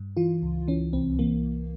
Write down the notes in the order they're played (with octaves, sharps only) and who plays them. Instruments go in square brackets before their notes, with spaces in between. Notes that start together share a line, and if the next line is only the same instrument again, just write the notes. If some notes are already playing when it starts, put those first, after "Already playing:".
Already playing: [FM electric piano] G2
E3 F4
C#2
E3 C#4
C2 C4
E3 A#3